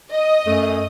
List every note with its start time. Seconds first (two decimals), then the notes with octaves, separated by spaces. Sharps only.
0.11 D#5 D#6
0.47 F#2 A3